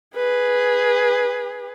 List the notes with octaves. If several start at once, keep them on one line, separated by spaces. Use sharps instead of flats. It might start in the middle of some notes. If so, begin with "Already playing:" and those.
G#4 B4